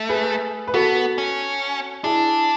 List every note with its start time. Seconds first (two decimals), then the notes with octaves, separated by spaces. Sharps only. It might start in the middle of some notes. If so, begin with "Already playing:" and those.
Already playing: A3
0.09 G#4 B4
0.67 B4
0.74 B3 F#4 A4
1.18 C#4
2.04 D4 E4 G#4